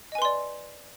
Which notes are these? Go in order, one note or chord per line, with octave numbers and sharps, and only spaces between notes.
B4 D5 D#5 G#5 C6